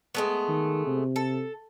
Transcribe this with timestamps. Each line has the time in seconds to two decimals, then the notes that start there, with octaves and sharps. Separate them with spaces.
0.15 G#3 A3 B3
0.48 D#3
0.86 C3
1.16 A4